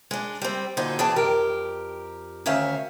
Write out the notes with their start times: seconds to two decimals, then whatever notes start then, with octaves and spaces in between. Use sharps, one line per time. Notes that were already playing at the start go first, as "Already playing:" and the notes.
0.11 G#3 D4
0.42 G3 C4
0.77 A#2 D3 D#4 F#4 C5
0.99 E3 G#4 D5 G5 A5
1.16 F2 G4 A#4
2.46 D2 D#3 C#4 E5 F5